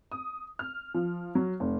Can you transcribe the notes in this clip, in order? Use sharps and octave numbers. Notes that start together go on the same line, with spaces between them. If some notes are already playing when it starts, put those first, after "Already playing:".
D#6
F6
F3
F#3
F1